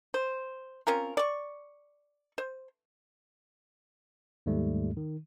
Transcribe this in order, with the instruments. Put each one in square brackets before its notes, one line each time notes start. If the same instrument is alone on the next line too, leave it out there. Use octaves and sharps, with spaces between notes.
[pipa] C5
C4 C#4 F4 A#4
D5 C#6
C5
[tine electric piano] D#2 G#2 G3 A3
D#3